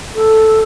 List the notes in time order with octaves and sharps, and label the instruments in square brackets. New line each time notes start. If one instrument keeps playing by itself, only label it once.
[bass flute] A4